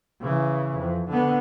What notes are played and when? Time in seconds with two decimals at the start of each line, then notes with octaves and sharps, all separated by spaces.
0.20 C#3 E3
0.78 F2
1.09 D3 B3